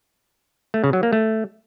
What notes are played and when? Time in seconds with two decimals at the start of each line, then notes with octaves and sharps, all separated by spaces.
0.74 A3
0.84 C#3
0.93 F#3
1.03 A#3
1.13 A3